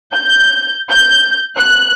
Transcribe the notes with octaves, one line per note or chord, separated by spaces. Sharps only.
G6
G6
F#6